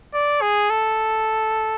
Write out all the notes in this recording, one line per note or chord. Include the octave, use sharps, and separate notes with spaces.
D5
G#4
A4